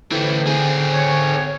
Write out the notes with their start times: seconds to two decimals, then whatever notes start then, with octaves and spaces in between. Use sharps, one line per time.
0.12 D3 E3 A3 C5 G5
0.47 C4 G#4
0.94 C#5